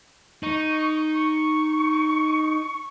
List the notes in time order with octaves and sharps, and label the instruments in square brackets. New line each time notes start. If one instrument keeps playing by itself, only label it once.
[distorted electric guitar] D#4 [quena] C#6
[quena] C#6